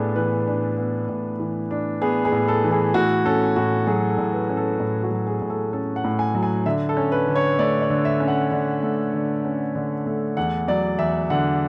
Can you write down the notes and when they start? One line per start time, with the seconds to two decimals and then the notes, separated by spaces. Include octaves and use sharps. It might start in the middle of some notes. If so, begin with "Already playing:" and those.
Already playing: A2 B3 D4 G#4 A4
0.16 E3 B4
0.47 D4
0.78 B3
1.09 A2
1.40 E3
1.71 D4
2.02 B3 G#4
2.25 G#4
2.32 A2
2.48 A4
2.64 E3
2.71 G#4
2.94 A2 F#4
3.25 C#4 A4
3.56 A2 F#4
3.87 F#3 G#4
4.10 A4
4.18 A2
4.34 B4
4.49 C#4
4.57 A4
4.80 A2
5.03 F#4
5.11 F#3
5.27 G#4
5.42 A2
5.50 A4
5.73 C#4 A4
5.96 F#5
6.04 A2
6.19 G#5
6.35 F#3
6.43 G#5
6.66 D3 E5
6.89 A4
6.97 C#4
7.12 B4
7.28 D3
7.36 C#5
7.59 A3 D5
7.82 D5
7.90 D3
8.05 E5
8.20 C#4
8.28 F#5
8.52 D3
8.83 A3
9.13 D3
9.45 C#4
9.75 D3
10.06 A3
10.37 E2 F#5
10.68 F#3 D5
10.99 E2 E5
11.30 D3 F#5